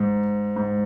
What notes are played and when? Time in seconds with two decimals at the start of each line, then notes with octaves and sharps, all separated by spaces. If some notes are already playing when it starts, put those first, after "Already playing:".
Already playing: G#2
0.56 G#2